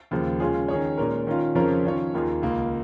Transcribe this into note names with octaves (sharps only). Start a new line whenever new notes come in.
D#2 C#3 F3 A#3
C#3 G#3 C#4 F4 G#4
D#3 C#4 G#4 C#5
A#2 G#3 C#4 A#4
D#3 C#4 F4
F2 C#3 F3 C#4 A#4
D#3 C#4 F4 C#5
D#2 D#3 A#3 F4 G#4
C#2 C#3 A#3 F4